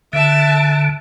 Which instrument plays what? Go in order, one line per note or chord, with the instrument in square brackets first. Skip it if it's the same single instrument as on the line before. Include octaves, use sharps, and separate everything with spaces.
[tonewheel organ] D3 [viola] E5 A5